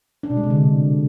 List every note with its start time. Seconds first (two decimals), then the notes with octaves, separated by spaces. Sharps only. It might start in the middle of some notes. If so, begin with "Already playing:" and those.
0.23 D4
0.30 B2
0.37 G#3
0.44 C3
0.50 D3